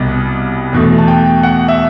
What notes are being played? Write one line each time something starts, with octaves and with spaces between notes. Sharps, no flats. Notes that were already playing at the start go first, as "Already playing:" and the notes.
Already playing: C2 B2 G3 D#5
E2 B2 A3
A5
G5
F#5
E5